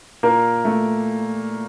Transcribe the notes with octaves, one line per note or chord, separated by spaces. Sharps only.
A#2 A#3 A#4
A3